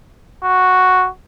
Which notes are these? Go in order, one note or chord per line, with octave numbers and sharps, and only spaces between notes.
F#4